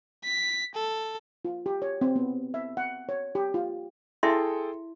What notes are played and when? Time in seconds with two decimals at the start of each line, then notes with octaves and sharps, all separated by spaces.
0.24 B6
0.75 A4
1.45 F4
1.66 G4
1.82 C#5
2.01 C4
2.16 B3
2.54 E5
2.77 F#5
3.09 C#5
3.35 G4
3.54 F4
4.23 E4 G#4 A4 E5 G5 C6